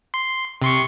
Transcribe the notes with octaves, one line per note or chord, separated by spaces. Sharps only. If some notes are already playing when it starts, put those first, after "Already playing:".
C6
C3 C6 C#6